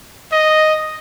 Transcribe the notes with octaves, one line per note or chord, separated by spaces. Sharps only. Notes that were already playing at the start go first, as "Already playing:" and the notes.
D#5